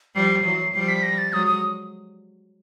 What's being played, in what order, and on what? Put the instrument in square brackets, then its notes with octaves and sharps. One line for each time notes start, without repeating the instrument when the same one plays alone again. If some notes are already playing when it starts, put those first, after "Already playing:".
[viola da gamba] F3 G3 [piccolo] C7
[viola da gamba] E3 F#3
[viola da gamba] F3 G3 [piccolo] C7
[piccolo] B6
A#6
A6
[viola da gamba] F#3 G#3 [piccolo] D#6
[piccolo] D#6